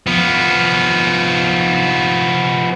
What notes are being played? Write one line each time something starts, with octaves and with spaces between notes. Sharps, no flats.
F3 B3